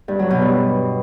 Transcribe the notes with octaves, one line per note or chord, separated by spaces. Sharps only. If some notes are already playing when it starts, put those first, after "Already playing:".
G2
F#3
B2
G2